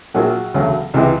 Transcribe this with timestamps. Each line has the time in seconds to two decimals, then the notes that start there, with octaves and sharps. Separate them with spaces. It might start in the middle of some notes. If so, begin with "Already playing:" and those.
0.14 A#1 A#2 F#3 F#4 G#4
0.54 E1 D2 C#3 F#3
0.94 C#2 C3 E3 G#3